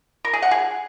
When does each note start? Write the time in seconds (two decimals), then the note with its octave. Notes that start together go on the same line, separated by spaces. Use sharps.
0.25 A#4
0.33 G#4
0.42 F#5
0.51 G#4